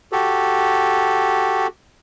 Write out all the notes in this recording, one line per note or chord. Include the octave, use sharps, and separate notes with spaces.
F#4 G4 A4